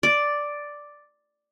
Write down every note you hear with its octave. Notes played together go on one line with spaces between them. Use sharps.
D5